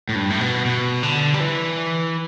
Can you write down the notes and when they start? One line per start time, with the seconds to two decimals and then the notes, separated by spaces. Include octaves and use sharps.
0.09 A2
0.15 G2
0.30 A2
0.41 B2
0.65 B2
1.03 D3
1.34 G3
1.40 E3